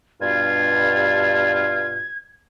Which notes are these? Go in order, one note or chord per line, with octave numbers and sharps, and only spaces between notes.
G2 B2 F4 G#6